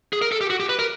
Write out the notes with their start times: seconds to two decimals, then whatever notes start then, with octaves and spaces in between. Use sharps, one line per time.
0.13 G#4
0.22 A#4
0.32 A4
0.41 G4
0.50 F#4
0.60 G4
0.69 B4
0.79 A#4